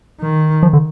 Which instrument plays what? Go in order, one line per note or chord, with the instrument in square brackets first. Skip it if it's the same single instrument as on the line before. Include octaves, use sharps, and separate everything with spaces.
[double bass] D#3
[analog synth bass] F3
D3